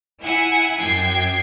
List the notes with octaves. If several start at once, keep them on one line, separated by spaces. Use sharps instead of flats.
E4 F#5 G#5
F#2 G5 G#6 C7